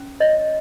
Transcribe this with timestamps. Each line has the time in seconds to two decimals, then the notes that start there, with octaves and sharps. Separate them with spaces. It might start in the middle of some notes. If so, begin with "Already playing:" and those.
Already playing: C#4
0.20 C#5 D#5